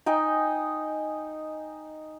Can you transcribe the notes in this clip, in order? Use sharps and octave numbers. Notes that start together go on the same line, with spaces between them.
D#4 D#5 G5 G#5